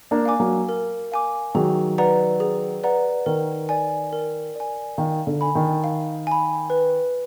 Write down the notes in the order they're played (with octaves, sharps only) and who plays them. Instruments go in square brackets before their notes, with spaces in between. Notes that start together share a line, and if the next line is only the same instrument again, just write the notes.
[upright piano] A#3 D4
[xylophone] F5 G#5 D6
[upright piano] F#3 A#3
[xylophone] A#4
F5 G#5 D6
[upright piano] D#3 F#3 [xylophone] G#4
[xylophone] B4 D5 F#5 A#5
G#4
B4 D5 F#5 A#5
[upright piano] D#3 [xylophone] A#4
[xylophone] D5 G#5
A#4
D5 G#5
[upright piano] D#3 [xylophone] F5
[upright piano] D3
[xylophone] G#5 B5
[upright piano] D#3
[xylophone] F5
G#5 B5
B4